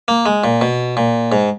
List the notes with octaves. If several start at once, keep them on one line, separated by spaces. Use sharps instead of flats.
A#3
G#3
A#2
B2
A#2
G#2